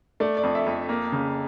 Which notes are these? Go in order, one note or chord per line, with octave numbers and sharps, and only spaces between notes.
A3 D5
D5
F2
E5
F2
A#3
C#3